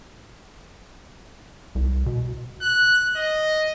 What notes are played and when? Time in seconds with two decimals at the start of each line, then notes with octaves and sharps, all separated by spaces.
1.75 C2
2.06 B2
2.62 F#6
3.17 D#5